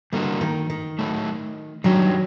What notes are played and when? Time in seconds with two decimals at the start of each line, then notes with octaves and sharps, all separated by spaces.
0.13 D3 G3 A#3 F#4 A#4
0.41 D#3
0.70 D#3
0.99 A2 F#3 A3
1.84 D#3 F#3 G3 D4 G4